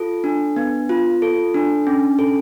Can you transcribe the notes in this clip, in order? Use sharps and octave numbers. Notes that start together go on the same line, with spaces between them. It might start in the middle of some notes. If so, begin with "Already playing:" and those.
Already playing: F4 A4
D4
B3
F4
A4
D4
C#4
A4